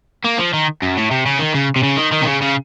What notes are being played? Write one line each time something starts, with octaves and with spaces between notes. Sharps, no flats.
A#3
F3
D#3
F#2
A2
C3
C#3
D#3
C#3
C3
C#3
D#3
D#3
C3
C#3
C#3